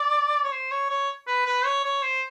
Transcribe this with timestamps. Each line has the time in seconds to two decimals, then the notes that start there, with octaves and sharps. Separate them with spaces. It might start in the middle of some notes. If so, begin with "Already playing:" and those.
Already playing: D5
0.44 C#5
0.52 C5
0.72 C#5
0.90 C#5
1.27 B4
1.46 B4
1.65 C#5
1.85 C#5
2.03 C5